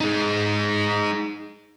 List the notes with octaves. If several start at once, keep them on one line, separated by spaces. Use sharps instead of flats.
G#3 D#4